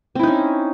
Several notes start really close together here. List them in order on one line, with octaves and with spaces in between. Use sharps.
C4 E4 D#4 C#4